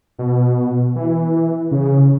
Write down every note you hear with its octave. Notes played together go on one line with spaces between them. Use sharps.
B2
E3
C#3